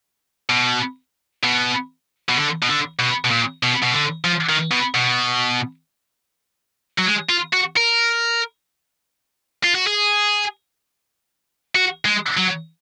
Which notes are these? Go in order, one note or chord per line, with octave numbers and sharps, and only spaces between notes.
B2
B2
B2
D3
B2
D3
B2
B2
A#2
B2
B2
D3
F3
D#3
B2
B2
F#3
G#3
F4
F#4
A#4
F4
F#4
G#4
F#4
G#3
F#3